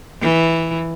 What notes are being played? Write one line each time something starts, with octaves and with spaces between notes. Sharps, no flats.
E3